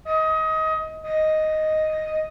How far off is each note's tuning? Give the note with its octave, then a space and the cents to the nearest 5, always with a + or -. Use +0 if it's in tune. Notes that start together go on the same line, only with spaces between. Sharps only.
D#5 +25
D#5 +0